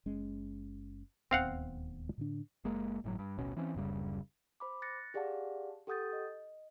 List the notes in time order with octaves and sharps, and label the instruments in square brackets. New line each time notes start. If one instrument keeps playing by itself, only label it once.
[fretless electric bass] F#1 G#3 C#4
[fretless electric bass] D1 D#2 B3 [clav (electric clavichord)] C4 F5 F#5
[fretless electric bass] A2 D3 D4
[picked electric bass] F#1 G#3 A#3
G1 A2 F#3
G2
D1 A1 B2 C#4
E3 C4 C#4
D1 F#2 C#3 G3
[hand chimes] C5 B5 D6
F#6 A6 A#6 C#7
G4 G#4 D5 F5 F#5 A5
G4 A4 F#5 D#6 G6 A6
D#5